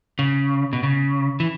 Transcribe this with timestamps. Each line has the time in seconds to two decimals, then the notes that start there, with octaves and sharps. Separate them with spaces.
0.19 C#3
0.73 B2
0.83 C#3
1.40 E3